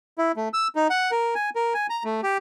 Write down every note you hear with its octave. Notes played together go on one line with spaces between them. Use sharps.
E4
A3
E6
D#4
F#5
A#4
G#5
A#4
G#5
A#5
A3
G4